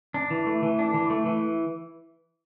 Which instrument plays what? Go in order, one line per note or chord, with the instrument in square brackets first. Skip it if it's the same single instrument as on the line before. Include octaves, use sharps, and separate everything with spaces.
[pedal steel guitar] D4
E3
A3
E3
D4
E3
A3
E3